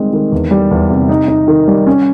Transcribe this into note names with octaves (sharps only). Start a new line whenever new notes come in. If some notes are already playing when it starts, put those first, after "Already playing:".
Already playing: D#3 G3 G#3 C4
D#3
E2
G3
E2
C3
D#4
D#4
D#3
G3
C#4